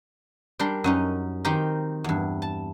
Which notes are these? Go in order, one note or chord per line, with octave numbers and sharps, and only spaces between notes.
G3 D4 A#4 C6
F#2 C#4 D#4
D#3 C4 D#4 G4 A#4
E2 G2
A5